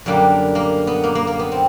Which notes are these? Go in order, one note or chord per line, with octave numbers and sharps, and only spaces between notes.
F#2 D3 G3 A#3
A#3
B3
A#3
A#3
A#3
B3
C4